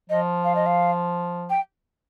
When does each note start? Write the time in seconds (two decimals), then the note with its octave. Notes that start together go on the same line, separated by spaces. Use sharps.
0.10 F3 D#5
0.44 F5
0.55 D#5
0.66 F5
1.50 G5